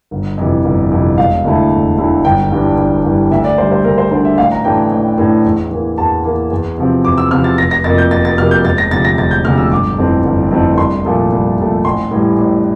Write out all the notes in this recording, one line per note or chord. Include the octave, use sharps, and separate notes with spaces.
G1
F2 C3 E3
G1
F2 C3 E3
E1 F5
D2 D3 A3 E4
E1
D2 D3 A3 E4
G1 G5
G2 E3 G3 D4
G1
G2 E3 G3 D4
D2 E5
D5
D3 G3 C5
C5
D2 A#4
C5
D3 G3 C5
E5
A1 F5
A#5
A2 E3 A3 D4 G5
A1
A2 E3 A3 D4
E2
E3 A#3
E2 A5
E3 A#3
E2
C3 F3 C4
E2 D6
E6
C3 F3 C4 F6
A6
F1 A#6
A#6
F2 C3 F3 A#3 A6
G6
F1 A6
A6
F2 C3 F3 A#3 F6
G6
E1 A6
A#6
D2 C3 F3 A6
A#6
E1 A6
G6
D2 C3 F3 F6
E6
G1 D6
F2 E3 A3 C4
G1
F2 E3 A3 C4
C2 C6
A#2 F3 A3
C2
A#2 F3 A3
A1 C6
A2 E3 G3
A1